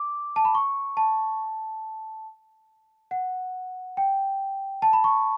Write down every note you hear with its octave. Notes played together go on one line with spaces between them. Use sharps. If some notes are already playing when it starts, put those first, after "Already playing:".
Already playing: D6
A5
B5
C#6
A5
F#5
G5
A5
B5
C#6